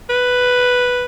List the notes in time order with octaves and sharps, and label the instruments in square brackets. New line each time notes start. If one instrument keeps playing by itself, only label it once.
[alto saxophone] B4